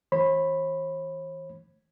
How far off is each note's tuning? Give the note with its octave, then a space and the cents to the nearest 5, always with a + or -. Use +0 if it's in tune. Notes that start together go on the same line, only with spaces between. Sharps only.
E3 -30 C#5 -45 B5 +0